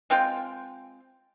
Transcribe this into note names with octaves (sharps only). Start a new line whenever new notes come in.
G#3 C4 F4 G5